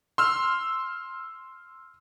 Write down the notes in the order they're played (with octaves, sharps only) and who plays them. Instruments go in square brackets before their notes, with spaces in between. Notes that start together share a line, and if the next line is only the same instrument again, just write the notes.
[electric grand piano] C6 E6 F6